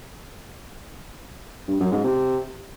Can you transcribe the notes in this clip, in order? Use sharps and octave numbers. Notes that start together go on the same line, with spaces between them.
G2
F#2
G#2
C3